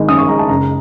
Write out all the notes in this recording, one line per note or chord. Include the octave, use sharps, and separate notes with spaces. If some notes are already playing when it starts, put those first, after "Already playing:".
Already playing: G#1 D#3 G#3
C#4 D#6
C#6
G#3 A#5
A5
F#1 A#5